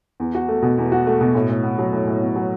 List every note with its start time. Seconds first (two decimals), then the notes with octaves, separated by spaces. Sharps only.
0.20 E2
0.35 F#4
0.48 A3
0.62 B2
0.78 E2
0.92 F#4
1.07 A3
1.21 B2
1.35 A2
1.50 A2
1.64 B3
1.79 F#3
1.93 A2
2.07 A2
2.21 B3
2.35 F#3